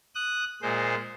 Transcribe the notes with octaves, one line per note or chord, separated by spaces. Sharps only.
D#6 F#6
A#2 G#3 C5